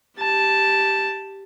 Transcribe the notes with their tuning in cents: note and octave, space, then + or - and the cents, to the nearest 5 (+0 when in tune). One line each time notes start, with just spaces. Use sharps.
G4 +0 A5 +0